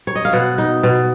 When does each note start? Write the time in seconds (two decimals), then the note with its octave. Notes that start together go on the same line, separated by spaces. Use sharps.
0.07 C#5
0.15 D#5
0.25 F5
0.33 B2 F#5
0.58 D#4
0.83 B2